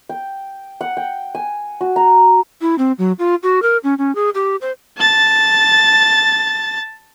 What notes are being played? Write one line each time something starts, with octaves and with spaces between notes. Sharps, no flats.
G5
F#5
G5
G#5
F#4
A#5
E4
C4
F#3
F4
F#4
A#4
C#4
C#4
G#4
G4
C5
A5 A6